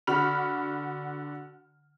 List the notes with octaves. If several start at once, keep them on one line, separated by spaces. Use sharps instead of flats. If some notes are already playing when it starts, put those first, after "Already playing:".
D3 F#4 F#5 B5 F6 F7